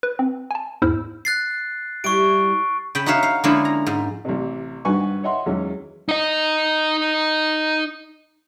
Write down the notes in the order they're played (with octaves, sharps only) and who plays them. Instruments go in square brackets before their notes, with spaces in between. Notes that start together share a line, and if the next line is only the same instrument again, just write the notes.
[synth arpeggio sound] B4
C4
G#5 A5
E2 G#2 E4 C5 E6 F6
[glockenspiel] F#6 A6 C7
[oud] G3 E4 G4 [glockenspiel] C#6 D7
[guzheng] C#3 G5 B5
D#4 F#4 C#5 E5 F5
F5
D3 F3 G#3 A#3 C#4 E4
A#5
G#2
[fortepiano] A1 C3
G#1 G2 F#4 B4 G#5 C#6
C#5 D#5 E5 F#5 C6
E2 D#3 F#3 G#3 C#4
[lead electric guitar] D#4 D#5